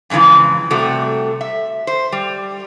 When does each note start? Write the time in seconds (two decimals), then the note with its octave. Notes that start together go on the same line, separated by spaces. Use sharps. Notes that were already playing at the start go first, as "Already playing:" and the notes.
0.10 F2 G#2 C#3 E3 F3
0.71 C3 G3 A3 F#4
1.41 E5
1.87 C5
2.12 G3